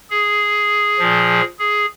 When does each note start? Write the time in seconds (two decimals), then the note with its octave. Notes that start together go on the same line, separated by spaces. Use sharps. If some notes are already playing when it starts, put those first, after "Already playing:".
0.10 G#4
0.99 A#2 F3
1.59 G#4